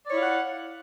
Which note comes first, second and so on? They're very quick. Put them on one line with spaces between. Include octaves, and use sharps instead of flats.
D5 C#5 E4 F5 F#5